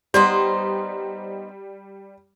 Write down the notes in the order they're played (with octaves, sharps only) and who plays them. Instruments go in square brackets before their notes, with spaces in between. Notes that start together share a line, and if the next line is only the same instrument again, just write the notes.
[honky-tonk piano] G3 [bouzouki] B3 D#4 C5 [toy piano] D5 C6